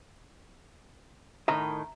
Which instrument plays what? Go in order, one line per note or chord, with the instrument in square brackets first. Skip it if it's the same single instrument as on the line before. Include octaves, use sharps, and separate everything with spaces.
[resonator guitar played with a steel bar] A2 D#3 [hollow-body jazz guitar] E5 A#5